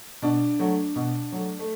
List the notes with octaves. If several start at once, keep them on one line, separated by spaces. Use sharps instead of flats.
B2 D4
F#3 A3
B2
F#3 A3
A3